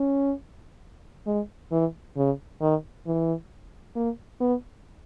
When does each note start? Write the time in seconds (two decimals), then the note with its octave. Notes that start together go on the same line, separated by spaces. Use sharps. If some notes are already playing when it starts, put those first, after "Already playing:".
Already playing: C#4
1.27 G#3
1.72 E3
2.17 C#3
2.61 D#3
3.06 E3
3.96 A#3
4.41 B3